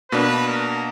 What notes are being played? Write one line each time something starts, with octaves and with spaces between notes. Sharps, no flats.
B2 A#3 D4 B4
A#4